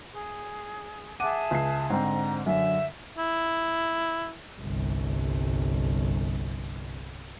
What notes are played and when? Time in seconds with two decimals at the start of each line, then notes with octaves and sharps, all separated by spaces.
0.11 G#4
1.20 G#4 E5 F#5 A5 D6 D#7
1.51 C#2 C7
1.90 G#2 D3 C4 A#5
2.46 F#2 D3 E5
3.18 E4
4.61 G1 C2